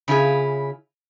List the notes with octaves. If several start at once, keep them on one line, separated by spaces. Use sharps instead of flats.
C#3 E4 F4 G#4